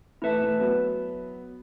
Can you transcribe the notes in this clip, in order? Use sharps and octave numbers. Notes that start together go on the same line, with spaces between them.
E3 A3 E4 B4 E5 A5
E3 A3
F#3 B3